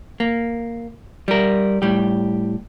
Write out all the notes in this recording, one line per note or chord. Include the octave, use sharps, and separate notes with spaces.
A#3
G3 A#4
A2 G3 G4